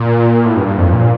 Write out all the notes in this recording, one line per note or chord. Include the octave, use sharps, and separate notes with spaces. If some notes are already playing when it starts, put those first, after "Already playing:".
Already playing: A#2
A2
G2
G2
F2
A#2